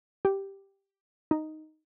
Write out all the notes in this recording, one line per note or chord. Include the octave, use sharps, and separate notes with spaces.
G4
D#4